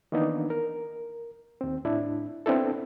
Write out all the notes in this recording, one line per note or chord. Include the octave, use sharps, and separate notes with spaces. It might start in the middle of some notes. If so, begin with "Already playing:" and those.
D#3 E3 A#3 B3 D4 D#4
A#4
D#2 C4
A2 D4 E4
B3 C4 D4 E4 A4